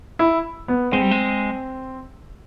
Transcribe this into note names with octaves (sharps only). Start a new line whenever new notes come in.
E4
B3
G#3 C4
G3
G#3